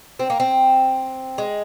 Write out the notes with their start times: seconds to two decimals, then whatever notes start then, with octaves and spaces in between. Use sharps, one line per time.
0.19 C4
0.30 A#3
0.40 C4
1.38 G#3